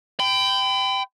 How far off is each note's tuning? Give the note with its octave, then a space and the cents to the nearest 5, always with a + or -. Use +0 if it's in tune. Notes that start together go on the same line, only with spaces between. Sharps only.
G5 +0 B5 +40